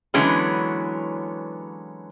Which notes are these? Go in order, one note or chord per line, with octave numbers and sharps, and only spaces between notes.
D3 E3 F#3 G#3 B3 C#4